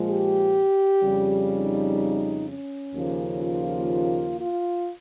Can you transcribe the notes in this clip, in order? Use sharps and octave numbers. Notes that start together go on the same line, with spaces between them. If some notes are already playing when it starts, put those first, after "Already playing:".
Already playing: A#2 F3 G#3
G4
F2 C#3 G3
D#4
C#4
D#2 C#3 F3 A#3
F4
F4